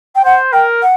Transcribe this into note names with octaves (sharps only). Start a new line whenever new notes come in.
G5
C5 F#5
A#4 G5
F#5